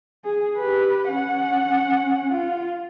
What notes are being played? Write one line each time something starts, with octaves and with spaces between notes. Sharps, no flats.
G#4
G4 B4
C#4 F#5
F4